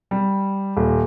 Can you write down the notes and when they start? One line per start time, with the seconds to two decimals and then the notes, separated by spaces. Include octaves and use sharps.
0.11 G3
0.77 D#1